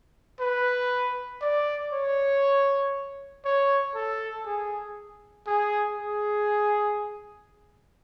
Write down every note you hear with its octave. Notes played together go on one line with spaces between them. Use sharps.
B4
D5
C#5
C#5
A4
G#4
G#4
G#4